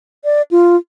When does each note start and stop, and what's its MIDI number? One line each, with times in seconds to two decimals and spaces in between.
0.25 0.42 74
0.51 0.76 65